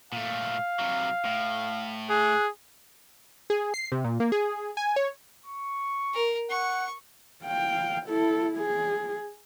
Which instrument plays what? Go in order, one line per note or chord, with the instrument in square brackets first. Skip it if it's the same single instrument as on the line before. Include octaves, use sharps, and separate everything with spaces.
[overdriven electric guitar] A#2 A3 [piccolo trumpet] F5
[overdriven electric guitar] C3 F#3
A2
[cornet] G#4 [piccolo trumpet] F#6
[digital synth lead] G#4
C7
C3
A#2
A#3
G#4
G#5
C#5
[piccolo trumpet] C#6
[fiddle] A#4
[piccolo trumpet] F#5 [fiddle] C#6
[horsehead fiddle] F5 G5
E4 A4
G#4